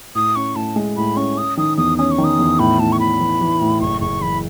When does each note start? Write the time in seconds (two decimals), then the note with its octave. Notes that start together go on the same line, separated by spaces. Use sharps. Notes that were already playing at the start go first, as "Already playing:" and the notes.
0.15 A2 D#6
0.36 C#4 C#6
0.56 A2 A5
0.76 G#3
0.97 A2 B5
1.17 C#4 C#6
1.38 C#4 D#6
1.57 D#3 D#6
1.77 E2 D#6
1.98 C#4 D#6
2.11 C#6
2.18 D#3
2.24 D#6
2.39 E2
2.59 A2 B5
2.79 A2 A5
2.92 C#6
2.99 A2 B5
3.20 E3
3.41 E3
3.61 A2
3.81 F#1 C#6
4.01 F#1 C#6
4.21 E3 B5